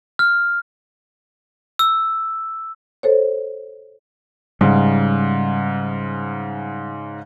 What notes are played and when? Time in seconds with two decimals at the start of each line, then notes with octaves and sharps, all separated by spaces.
0.19 F6
1.79 E6
3.03 A4 C5 C#5
4.61 G#2 C#3 G3